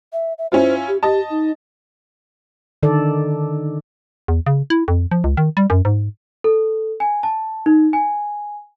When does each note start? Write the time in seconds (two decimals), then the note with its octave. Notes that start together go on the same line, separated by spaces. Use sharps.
0.13 E5
0.38 E5
0.52 C#4 E4 F4 C5
0.88 G4
1.03 G4 D#5 A5
1.30 D#4
2.83 D3 D#3 A4 D5
4.28 E2
4.47 C#3
4.70 E4
4.88 F2
5.11 F3
5.24 C#2
5.37 D#3
5.57 G3
5.70 F#2
5.85 G#2
6.44 A4
7.00 G#5
7.23 A5
7.66 D#4
7.93 G#5